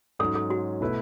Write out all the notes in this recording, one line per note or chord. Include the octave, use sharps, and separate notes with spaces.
G#2 F#3 C#4 G#4 A4
A4
F#4
B2 A3 E4 B4